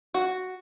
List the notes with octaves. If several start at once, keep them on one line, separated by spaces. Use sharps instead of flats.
F#4